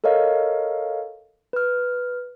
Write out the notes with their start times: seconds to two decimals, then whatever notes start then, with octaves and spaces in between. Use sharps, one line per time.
0.04 A4 A#4 C#5 D#5 F5
1.53 B4 F6